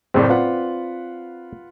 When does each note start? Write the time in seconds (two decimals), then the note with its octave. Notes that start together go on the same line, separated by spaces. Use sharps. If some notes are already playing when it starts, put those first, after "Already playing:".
0.14 F#1 A2 C#3 C4 D5
0.29 F4 B4 F#5